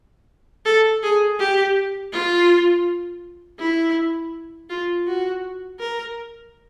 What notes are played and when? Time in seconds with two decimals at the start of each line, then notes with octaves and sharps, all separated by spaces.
0.65 A4
1.03 G#4
1.39 G4
2.13 F4
3.59 E4
4.69 F4
5.06 F#4
5.80 A#4